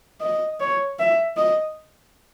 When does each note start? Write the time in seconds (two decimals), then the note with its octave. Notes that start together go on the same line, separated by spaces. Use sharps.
0.21 D#5
0.60 C#5
0.99 E5
1.37 D#5